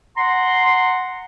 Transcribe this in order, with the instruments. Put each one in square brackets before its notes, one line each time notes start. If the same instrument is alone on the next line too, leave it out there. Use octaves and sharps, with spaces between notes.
[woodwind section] F#5 A#5 C6